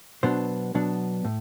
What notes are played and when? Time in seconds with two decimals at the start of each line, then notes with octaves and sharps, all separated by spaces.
0.23 B2 F#3 B3 D4 C5
0.75 B2 F#3 B3 D4
1.25 A2